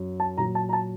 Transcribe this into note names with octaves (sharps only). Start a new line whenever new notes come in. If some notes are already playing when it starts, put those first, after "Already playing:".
Already playing: F#2 F#3
A5
A#2 F#3 A#5
A5
A#5
A5